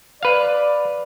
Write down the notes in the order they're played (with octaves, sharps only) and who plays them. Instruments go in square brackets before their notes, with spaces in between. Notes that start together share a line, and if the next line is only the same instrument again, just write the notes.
[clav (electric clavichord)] B4 F5 [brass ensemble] D5